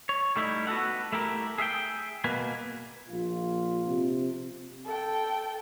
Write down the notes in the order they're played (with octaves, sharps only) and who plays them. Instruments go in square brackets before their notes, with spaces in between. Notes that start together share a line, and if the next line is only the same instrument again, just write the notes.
[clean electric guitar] C#5
G3 A3 D#4 E4
B3 F#4 A4 F#5
A3 E4 G4 A#4
G#4 E5 F5 G5
B2 A#3 B4 G#5
[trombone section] A#1 F4
[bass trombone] C3
[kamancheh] A4 G5